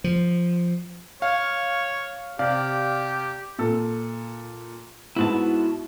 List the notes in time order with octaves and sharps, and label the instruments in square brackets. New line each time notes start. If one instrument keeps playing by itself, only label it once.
[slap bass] F3
[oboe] C#5 [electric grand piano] F5
[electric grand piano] C3 D5 F5 [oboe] G4
[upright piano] A#2 A4
[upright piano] G#2 B3 [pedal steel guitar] E4 F#4 A5